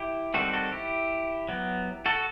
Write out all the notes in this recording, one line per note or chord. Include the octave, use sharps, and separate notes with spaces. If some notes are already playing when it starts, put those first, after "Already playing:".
Already playing: E4 G4
D#3 G3 C4 F#4 A4
F#4 A4
E4 G4
F#3 B3
F#4 A4